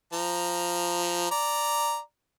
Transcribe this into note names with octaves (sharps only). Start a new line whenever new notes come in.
F3 A#5
D5 A#5